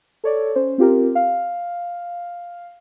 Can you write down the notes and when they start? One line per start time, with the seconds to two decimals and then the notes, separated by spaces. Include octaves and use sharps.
0.24 A4 C#5 D5
0.55 C#4 C5
0.78 C4 F4 G4 A#4
1.15 F5